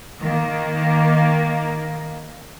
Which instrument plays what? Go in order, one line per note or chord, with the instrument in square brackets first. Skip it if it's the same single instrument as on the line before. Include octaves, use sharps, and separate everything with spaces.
[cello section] D#3 A#3